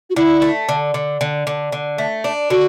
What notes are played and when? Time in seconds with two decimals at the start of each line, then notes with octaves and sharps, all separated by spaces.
0.10 F#4
0.16 D3 E4
0.42 A3
0.69 D3
0.94 D3
1.21 D3
1.47 D3
1.72 D3
1.98 A3
2.24 D4
2.50 D3 F#4